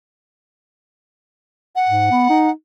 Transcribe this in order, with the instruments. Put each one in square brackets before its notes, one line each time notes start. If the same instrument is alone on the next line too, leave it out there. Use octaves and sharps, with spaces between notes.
[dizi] F#5
[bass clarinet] G#2
B3
D#4